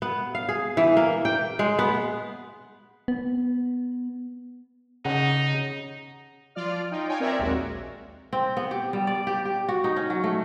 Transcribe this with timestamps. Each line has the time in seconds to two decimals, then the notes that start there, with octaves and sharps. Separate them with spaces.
0.02 B3
0.35 F5
0.49 G#4
0.77 E3
0.97 A#3
1.25 G5
1.59 G#3
1.79 B3
3.08 B3
5.05 C#3 D#4 F#5
6.55 F3 F4 D5 F6
6.91 D#4 F4 G5
7.08 C#5 F5 G5 G#5
7.20 C4 A#4 C#5 D5 E5 A#5
7.39 A#1 D#2 G#3 F#4
8.33 C4
8.57 B3
8.71 G4
8.93 G3
9.07 D5
9.27 G4
9.45 G4
9.69 F#4
9.84 D#4
9.96 C#4
10.10 F#3
10.24 A3